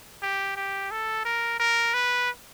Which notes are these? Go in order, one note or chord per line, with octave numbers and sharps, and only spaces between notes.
G4
G4
A4
A#4
A#4
B4